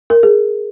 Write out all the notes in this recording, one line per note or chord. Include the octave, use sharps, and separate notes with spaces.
A#4
G#4